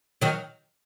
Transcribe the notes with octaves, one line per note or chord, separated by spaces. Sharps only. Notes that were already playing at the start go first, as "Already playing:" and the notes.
D#3 F#3